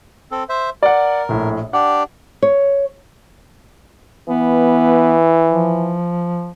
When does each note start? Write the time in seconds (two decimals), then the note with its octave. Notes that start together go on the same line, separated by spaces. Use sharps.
0.31 C4 A4
0.49 C5 E5
0.83 A#4 D5 F#5
1.29 A#1 A2
1.73 D4 G4 D5 F#5
2.43 C#5
4.30 E3 B3
5.50 F3